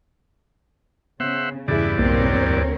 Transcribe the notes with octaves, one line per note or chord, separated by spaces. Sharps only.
C#3 B3 C5 E5 F#5
E2 G2 C#3 E3 E4 G#4 D5
B1 A#3 C4 A#4 C#5
D2